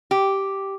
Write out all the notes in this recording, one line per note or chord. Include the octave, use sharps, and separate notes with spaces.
G4